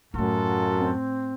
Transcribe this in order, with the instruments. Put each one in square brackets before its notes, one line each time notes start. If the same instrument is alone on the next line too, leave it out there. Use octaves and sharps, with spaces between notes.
[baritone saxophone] F#2 [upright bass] A2 A3 [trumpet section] F4 F#4 A4
[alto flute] C4